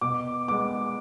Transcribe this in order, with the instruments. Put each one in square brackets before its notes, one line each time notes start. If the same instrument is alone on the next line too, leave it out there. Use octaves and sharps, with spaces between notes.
[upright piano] B2 D6
G#3 B3 D6